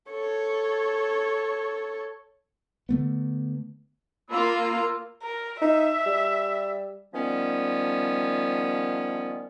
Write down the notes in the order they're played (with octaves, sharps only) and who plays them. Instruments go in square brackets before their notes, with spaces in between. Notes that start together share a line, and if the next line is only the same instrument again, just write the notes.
[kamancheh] A4 C#5
[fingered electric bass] D3 A3 B3
[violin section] A#3 F4 [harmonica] B5 E6
[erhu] A#4
[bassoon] D#4 [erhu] E5
[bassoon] G3
[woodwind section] D#3 F3 G3 B3 C#4